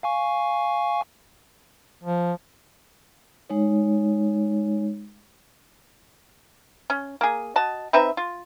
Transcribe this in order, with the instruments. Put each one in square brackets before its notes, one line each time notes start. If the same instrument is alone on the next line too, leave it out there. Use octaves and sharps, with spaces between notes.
[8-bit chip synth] F5 G#5 C#6
[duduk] F3
[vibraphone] G#3 D#4 C#5
[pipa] C#4
A#3 G#4
F#4 D#5 A5
C4 D#4 B4 E5
F4